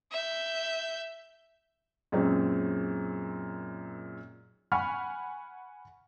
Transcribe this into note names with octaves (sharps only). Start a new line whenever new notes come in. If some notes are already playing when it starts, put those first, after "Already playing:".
E5 G6
F#2 A#2 G#3 C4 C#4 D#4
F#5 G#5 B5 C#6 F6